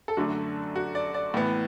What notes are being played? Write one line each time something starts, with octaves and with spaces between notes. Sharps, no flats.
A4
F#2 D3 A3 D4 F#4
F#4
D5
D5
A2 E3 B3